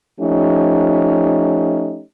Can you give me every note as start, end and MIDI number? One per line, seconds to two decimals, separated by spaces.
0.20 2.01 53
0.20 2.01 57
0.20 2.01 61
0.20 2.01 63
0.20 2.01 67